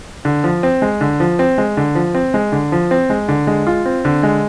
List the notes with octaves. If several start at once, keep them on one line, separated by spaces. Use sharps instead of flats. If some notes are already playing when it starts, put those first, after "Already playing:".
D3
F3
C4
G#3
D3
F3
C4
G#3
D3
F3
C4
G#3
D3
F3
C4
G#3
D3
G#3
F4
C4
D3
G#3